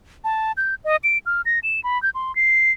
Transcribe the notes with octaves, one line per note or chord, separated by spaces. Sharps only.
A5
G6
D#5
D7
F6
A#6
E7
B5
G6
C6
C7